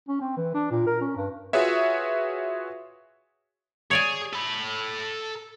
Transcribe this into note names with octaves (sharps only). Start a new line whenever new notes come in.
C#4
C4
E3
D4
A#2
A#4
C#4
G2
F4 F#4 G#4 B4 C#5 E5
G#4 C#5 D5 G#5
A4 B5